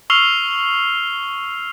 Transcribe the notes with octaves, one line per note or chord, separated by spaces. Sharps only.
C#6 E6 F6 C7 F7 G7